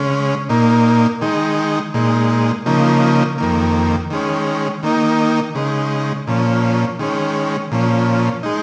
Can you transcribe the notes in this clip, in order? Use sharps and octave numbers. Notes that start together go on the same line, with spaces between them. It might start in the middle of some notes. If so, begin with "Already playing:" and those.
Already playing: C#3 G#3 C#4
A#2 A#3 D#4
D#3 G#3 D#4
A#2 G#3 D#4
C#3 F3 A#3 D#4
F2 D#3 A#3
D#3 G#3 C#4
D#3 A#3 D#4
C#3 G#3 D#4
A#2 F3 C#4
D#3 G#3 C#4
A#2 F3 C#4
G#3 D#4